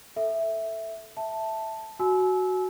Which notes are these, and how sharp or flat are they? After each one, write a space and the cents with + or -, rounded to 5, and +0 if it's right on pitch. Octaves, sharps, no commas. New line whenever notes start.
A4 +5 E5 +0
E5 +0 A5 +0
F#4 +0 G#5 +40 E6 -15